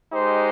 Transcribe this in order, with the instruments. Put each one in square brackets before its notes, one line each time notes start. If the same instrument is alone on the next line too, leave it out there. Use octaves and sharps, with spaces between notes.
[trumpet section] G#3 D#4 G4 C5